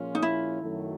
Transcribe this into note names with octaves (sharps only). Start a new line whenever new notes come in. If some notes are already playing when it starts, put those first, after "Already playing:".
Already playing: A#2 F3 G#3 C#4 F4
D#4
E4
F#2 D#3 F#3 A3